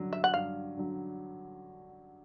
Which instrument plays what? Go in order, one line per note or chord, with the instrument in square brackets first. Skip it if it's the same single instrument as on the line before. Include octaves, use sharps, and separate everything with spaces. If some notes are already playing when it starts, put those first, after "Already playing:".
Already playing: [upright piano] G2 D3 F#3
[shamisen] E5
F#5
[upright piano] G2 [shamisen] F5
[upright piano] D3 F#3